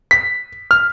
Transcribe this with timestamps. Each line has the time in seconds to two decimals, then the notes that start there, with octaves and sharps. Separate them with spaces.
0.11 B6
0.71 F6